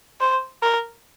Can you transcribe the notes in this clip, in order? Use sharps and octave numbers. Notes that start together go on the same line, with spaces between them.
C5
A#4